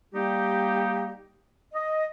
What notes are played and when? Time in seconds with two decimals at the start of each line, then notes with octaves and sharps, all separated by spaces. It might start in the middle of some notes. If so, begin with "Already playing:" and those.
0.14 G3 A#3 D#4 G4
1.75 D#5